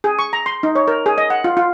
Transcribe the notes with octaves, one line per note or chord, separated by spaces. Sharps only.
G#4
C#6
A#5
C6
D#4
C#5
A#4
G#4
D#5
F#5
F4
F4